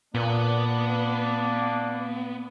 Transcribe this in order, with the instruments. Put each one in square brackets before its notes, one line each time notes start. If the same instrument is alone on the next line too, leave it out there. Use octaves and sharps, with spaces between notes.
[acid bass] A#2 [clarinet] A#3 [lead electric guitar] B3 [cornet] D4